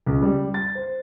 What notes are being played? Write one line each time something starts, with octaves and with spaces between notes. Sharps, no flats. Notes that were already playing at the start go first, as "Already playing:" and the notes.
C#2
G3
A6
C5